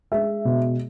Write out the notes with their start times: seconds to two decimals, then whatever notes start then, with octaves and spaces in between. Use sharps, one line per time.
0.11 G#3 E5
0.45 B2